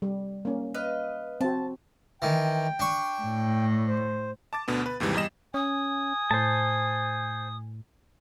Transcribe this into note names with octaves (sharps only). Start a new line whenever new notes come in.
G3
A#3 C#4
B4 D#5 F5
C4 F#4 A5
D#3 E3 G5
D4 C#6
A2
C5
A5 D6 A6
D2 B2 D3 B3
B4
D#2 G#2 C3 E3 G3
E2 G3 D#5 E7
C#4 G#5 D#6
A2 C5 A5